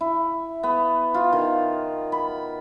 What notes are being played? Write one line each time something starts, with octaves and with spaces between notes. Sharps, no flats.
E4
B3
F4
D#3
B5